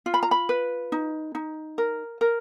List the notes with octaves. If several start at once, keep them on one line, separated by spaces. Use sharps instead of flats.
F4
B5
A#5
B5
B4
D#4
D#4
A#4
A#4